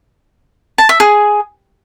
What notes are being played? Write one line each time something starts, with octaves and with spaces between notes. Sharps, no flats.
A5
E5
G#4